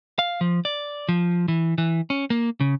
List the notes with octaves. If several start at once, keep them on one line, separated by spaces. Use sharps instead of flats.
F5
F3
D5
F3
E3
E3
C#4
A#3
C#3